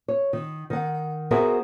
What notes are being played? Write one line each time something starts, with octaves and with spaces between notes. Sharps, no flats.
C#5
D#3
D#3 F#5
B3 F#4 G#4 A#4 C5 E5